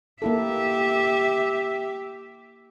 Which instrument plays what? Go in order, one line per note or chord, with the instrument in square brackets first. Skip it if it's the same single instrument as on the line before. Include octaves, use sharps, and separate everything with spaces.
[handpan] A#3 E4 A4 [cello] G4 E5